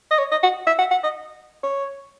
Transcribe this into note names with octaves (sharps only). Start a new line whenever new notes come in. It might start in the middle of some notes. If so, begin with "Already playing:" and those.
D#5
C#5
D#5
F#5
E5
F#5
F#5
D#5
C#5